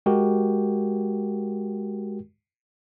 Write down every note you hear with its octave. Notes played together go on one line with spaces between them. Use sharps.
G#3 F#4 G4 A#4 G5